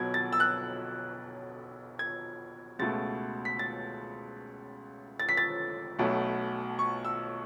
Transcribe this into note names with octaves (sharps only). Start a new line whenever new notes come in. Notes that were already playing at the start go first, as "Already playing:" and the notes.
Already playing: B1 B2 F#3 G#6
A6
E6
F#6
G#6
C#2 B2 A3 A6
B6
A6
A6
B6
A6
B1 B2 A3
C#6
E6